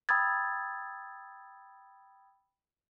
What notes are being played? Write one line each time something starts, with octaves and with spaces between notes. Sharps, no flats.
G5 B5 D#6 E6 G#6 A6